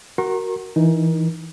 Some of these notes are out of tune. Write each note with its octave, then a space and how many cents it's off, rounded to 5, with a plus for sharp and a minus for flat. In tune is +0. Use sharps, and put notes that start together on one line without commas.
F#4 +15 A#4 +0 C#6 -45
E3 +0 D#4 +0 A#4 +30